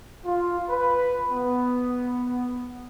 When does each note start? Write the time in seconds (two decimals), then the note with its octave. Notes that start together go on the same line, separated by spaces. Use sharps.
0.25 F4
0.70 B4
1.31 B3